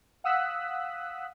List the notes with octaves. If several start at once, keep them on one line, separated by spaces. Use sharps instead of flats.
F5 F#5 D#6 E6 F#6 B6